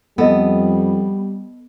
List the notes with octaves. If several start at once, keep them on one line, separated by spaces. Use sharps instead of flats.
F2 G3 B3 A4 D#5